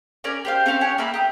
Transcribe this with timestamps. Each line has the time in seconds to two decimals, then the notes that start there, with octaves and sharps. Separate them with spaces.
0.24 C#4 A#4 D5 G#5
0.45 G4 C5 F5
0.66 C4 C#4 A4 F5
0.81 G4 C#5 F#5 G#5
0.98 A#3 A#4 E5 B5
1.14 G4 D#6